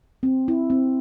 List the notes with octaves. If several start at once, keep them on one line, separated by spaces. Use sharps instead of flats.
C4
E4
C4